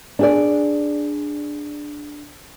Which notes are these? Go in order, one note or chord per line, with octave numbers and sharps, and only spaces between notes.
D4 G#4 D5